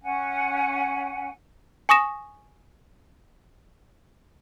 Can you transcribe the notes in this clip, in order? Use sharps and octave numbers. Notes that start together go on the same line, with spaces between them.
C#4 F#5 G#5
G#5 C#6 D#6 A#6 E7